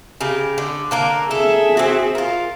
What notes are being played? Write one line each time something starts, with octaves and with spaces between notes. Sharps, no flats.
C#3 G4 A#4
D3
D3 A#3 A#4
G#4 A4 E5
C4 F#4
F4 A#4